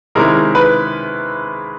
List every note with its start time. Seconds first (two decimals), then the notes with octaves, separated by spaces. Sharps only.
0.15 C3 D#3 G#3 C#4 E4 A#4
0.55 B4